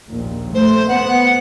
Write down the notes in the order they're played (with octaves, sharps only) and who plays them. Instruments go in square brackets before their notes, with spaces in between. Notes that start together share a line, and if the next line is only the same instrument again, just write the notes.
[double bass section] A#1 D#2 A#2
[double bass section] A3 [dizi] C5
[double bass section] B3 [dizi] F#5